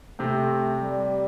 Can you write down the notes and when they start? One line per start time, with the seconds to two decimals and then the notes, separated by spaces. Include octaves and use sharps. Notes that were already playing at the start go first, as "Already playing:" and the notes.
0.19 C3 A3 C4
0.82 G3